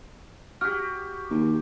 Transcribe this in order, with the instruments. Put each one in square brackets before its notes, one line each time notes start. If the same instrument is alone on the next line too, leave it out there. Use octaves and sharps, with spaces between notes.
[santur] F#4 G4 [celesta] F6
[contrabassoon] D#2